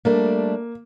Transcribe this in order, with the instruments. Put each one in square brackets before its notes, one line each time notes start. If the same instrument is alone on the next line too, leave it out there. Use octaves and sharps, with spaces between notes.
[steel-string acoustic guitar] G3 A3 D4 [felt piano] A#3